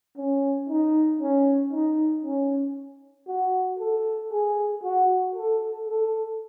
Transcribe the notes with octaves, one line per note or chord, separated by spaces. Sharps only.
C#4
D#4
C#4
D#4
C#4
F#4
A4
G#4
F#4
A4
A4